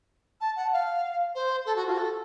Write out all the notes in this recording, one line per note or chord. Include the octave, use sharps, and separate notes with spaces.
A5
F#5
F5
C5
A4
F#4
F4
F#4
A4